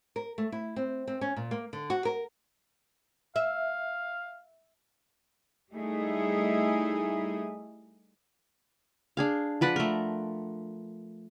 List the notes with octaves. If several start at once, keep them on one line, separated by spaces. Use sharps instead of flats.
A#4
A3
E4
C4
C4
C#4
A#2
A#3
D3
F#4
A#4
E5 F5
G3 A3 D#4 E4 G#4
D4 G#4 F5
F3 B4 D5 F#5
A3 A#4